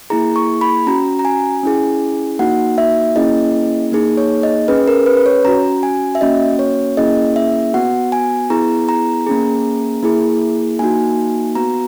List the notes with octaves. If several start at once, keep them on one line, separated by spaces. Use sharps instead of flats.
A#3 E4 G#4 A#5
C#6
B5
C#4 F#4 A#5
A#5
G#5
C#4 E4 G#4
A#3 D#4 F#4 F#5
E5
A#3 C#4 E4 G#4 D#5
A#3 D#4 G#4
C#5
D#5
C#4 G#4 B4
A#4
B4
B4
C#5
C#4 F#4 A#5
G#5
E5
A#3 C#4 F#4 D#5
C#5
A#3 C#4 E4 G#4 D#5
E5
B3 F#4 F#5
G#5
B3 E4 G#4 A#5
A#5
A#3 C#4 G#4
A#3 E4 G#4
A#3 D#4 F#4 G#5
B3 F#4 A#5